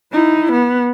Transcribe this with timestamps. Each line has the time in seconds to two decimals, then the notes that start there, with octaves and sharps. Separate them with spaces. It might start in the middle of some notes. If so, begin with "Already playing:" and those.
0.12 D#4 E4
0.52 B3